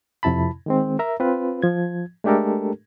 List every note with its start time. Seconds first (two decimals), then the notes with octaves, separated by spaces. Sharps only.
0.23 F2 C3 E4 A5 B5
0.66 D#3 G#3 C4
0.99 A#4 E5 A#5
1.20 C4 F4 B4
1.62 F3 G#6
2.24 G#3 A3 D4 G4 A4 A#4